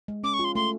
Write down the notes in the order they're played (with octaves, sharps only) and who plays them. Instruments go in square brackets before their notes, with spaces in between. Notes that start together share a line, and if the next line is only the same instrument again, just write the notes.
[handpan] G#3
[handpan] C#4 [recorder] D6
[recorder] C#6
[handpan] F4
[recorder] C6
[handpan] A3 [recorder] C6